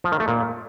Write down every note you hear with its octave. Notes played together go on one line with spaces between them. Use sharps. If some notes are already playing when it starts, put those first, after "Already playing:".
F3
D#3
A3
A#2